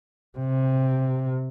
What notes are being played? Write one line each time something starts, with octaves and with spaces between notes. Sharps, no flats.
C3